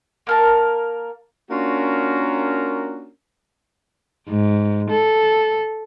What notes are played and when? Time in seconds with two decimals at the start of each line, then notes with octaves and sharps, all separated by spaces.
0.27 A#3 A#4 A5
1.50 A#3 C#4 D4 F4 F#4 A#4
4.29 G#2
4.91 A4